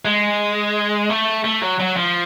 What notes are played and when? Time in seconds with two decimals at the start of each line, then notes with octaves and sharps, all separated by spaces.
0.05 G#3
1.10 A3
1.44 A3
1.62 F#3
1.80 F#3
1.96 F3